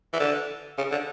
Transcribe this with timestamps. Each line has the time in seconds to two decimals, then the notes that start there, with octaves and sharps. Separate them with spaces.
0.13 E3
0.19 D3
0.78 C#3
0.91 D3